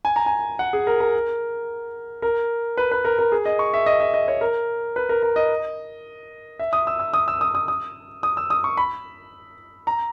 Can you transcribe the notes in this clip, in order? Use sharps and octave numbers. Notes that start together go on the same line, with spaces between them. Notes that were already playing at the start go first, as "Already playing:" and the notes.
G#5
A#5
G#5
F#5
G#4
A#4
A#4
A#4
B4
B4
A#4
A#4
G#4
D#5
C#6
E5
D#5
E5
D#5
C#5
A#4
B4
A#4
A#4
D#5
E5
D#6
E6
E6
D#6
E6
D#6
D#6
D#6
D#6
E6
D#6
C#6
B5
A#5